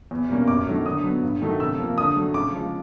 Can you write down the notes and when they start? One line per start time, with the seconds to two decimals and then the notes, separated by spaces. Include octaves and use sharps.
0.11 E2
0.29 B2 G3 A#3 C#4
0.48 F#2 D6
0.67 D#3 F#3 A3
0.85 D3 D#6
1.04 F#3 B3
1.23 G2
1.42 D#3 F#3 A3
1.60 C3 E6
1.78 F3 A#3
1.98 D3 D#6
2.16 F#3 A3
2.34 C#3 D6
2.53 F3 G#3